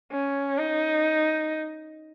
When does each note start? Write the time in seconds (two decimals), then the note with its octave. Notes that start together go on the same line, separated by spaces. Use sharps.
0.12 C#4
0.58 D#4